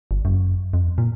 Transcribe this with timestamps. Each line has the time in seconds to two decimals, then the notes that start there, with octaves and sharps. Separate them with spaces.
0.11 G1
0.25 F#2
0.74 F2
0.98 A#2